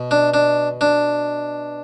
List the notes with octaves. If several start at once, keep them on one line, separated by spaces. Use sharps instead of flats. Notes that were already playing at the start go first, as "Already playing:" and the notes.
Already playing: B2
D4
D4
D4